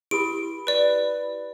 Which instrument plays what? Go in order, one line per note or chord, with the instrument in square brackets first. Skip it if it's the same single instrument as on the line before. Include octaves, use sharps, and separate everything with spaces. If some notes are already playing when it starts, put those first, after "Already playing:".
[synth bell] E4 G4 B5 [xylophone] D7
[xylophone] B4 D5